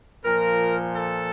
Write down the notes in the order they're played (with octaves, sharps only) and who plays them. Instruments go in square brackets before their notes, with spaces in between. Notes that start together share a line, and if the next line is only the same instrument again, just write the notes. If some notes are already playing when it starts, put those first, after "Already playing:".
[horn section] A#2 F3 A#4
A4